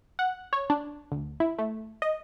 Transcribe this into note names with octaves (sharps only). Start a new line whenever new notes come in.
F#5
C#5
D4
D2
E4
A3
D#5